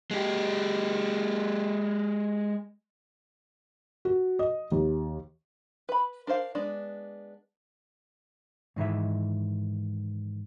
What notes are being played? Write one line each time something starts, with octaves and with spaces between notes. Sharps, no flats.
G#3 G4
F#4
D#5
D#2
B4 B5
D4 A#4 C5 F5
G#3 B3 D4
G#2 D#3 E3 E5